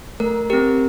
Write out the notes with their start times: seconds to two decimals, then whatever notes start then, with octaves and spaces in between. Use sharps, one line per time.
0.20 A3 A#4
0.50 C4 G4 A#4